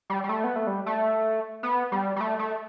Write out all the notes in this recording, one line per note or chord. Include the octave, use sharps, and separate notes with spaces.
G3
G3
A3
B3
A3
G3
A3
B3
G3
G3
A3
A3